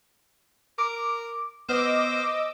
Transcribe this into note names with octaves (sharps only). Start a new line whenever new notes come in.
A#4 D6
B3 C5 D#5 D6 E6 F6